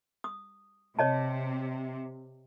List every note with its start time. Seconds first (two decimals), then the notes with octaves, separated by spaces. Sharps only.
0.24 D#6
0.99 C3 C#5 D#5 A5